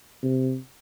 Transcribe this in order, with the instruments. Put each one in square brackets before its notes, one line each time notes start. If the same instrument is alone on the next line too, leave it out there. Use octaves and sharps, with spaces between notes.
[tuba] C3